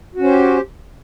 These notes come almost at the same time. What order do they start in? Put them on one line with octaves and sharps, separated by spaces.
F#4 C#4 C5 G4